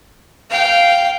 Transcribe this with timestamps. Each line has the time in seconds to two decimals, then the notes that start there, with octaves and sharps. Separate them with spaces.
0.50 F5 G5